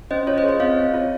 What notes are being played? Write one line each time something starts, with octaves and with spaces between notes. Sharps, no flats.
C#4 C5 D#5
F4 C#5
C5 D#5
G#4
C5 D#5
C4 C#5 F5
C4
F4